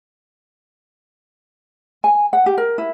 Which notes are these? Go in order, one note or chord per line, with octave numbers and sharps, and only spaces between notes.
G#5
F#5
G4
A#4
E4